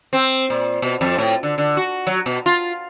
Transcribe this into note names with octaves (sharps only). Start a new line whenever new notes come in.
C4
A#2
B2
F2
A2
D3
D3
F#4
F#3
B2
F4